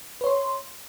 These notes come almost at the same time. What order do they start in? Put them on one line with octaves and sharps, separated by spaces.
B4 C#5 C6